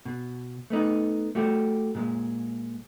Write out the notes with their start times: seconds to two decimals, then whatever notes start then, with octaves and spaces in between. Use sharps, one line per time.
0.05 B2
0.70 A3 B3 D#4
1.35 A3 F#4 G4
1.95 A#2 G#3